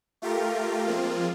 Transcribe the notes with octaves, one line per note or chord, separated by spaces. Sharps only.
A3 F4 G4 A4 A#4
F3 G#3 A#3 C4 F4